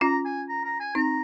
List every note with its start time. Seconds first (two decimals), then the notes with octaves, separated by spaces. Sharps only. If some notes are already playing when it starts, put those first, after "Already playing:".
0.01 C#4 F4 A#5
0.25 G#5
0.49 A#5
0.64 A#5
0.80 G#5
0.95 C4 D#4 A#5